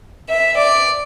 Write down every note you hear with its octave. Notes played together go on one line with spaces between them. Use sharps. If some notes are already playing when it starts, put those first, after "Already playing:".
E5
D5